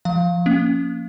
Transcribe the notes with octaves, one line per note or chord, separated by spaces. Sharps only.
F3 F5
A#3 C#4